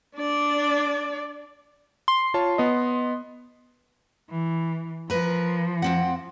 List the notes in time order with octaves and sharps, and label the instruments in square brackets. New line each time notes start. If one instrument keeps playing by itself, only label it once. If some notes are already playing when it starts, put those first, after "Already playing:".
[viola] D4 D5
[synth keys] C6
[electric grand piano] F4 C#5 A5
B3 D#5
[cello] E3
[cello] F3 [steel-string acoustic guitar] A#4 B4
[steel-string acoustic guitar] F2 C4 F#5